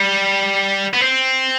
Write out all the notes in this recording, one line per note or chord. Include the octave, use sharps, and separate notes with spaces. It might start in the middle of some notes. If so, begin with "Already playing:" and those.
Already playing: G3
B3
C4